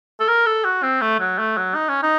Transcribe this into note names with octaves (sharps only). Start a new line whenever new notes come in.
A4
A#4
A4
F#4
C4
A3
F#3
A3
F#3
D#4
C#4
D#4